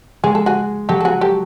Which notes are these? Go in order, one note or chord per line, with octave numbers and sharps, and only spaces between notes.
G#3 G#4
A4
F#4 G#4
F#3 G4 A4
A4
F#4 G#4
G4 A4